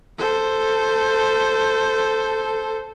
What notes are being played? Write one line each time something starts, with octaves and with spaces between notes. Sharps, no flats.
A4 C5